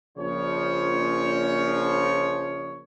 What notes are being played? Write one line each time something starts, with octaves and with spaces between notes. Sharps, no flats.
A#1 C#3 F3 C#5